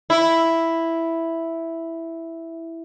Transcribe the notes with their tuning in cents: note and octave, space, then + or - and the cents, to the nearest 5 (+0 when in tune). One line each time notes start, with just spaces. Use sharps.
E4 +0